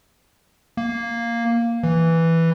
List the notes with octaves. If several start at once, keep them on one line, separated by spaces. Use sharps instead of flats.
A#3
E3